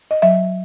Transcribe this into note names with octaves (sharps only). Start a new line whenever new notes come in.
D#5
F#3 E5